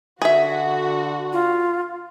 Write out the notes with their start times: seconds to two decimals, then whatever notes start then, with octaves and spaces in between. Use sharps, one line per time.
0.22 D3 F#4 G#4 E5
1.33 F4